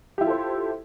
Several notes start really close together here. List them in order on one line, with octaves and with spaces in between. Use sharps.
G4 E4 F4 A4 C5